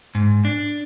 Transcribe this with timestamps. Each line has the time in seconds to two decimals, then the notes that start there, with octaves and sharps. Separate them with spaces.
0.15 G#2
0.45 D4